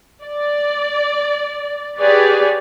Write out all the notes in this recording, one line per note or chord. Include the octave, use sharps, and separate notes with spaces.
D5
G4 G#4 B4 C#5 D5